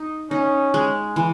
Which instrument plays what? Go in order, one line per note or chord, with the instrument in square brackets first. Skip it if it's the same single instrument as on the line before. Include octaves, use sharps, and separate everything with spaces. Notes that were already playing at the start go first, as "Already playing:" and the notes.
Already playing: [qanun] D#4
[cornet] C#4 [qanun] D#4
[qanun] G#3
E3